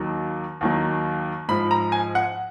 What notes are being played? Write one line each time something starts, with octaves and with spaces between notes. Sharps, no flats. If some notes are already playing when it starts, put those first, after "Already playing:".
Already playing: D#2 D#3 F#3
D#2 D#3 F#3
G#2 F3 B5
A#5
G#5
F#5